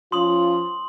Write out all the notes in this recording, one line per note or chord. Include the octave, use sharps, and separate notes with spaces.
F3 C#4 F4 C6 D#6 F#7